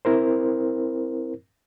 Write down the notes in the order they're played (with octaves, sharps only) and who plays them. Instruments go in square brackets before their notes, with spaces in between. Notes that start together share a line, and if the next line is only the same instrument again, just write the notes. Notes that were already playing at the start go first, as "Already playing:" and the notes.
[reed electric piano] C4 E4 A#4 C5